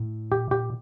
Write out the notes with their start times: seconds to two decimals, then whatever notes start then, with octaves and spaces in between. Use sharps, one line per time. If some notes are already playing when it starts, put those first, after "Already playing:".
Already playing: A2
0.32 A#2 G4
0.51 G4